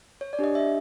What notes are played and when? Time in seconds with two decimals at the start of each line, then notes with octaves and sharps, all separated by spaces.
0.21 C#5
0.33 D5
0.39 D4 G4 D#5
0.55 E5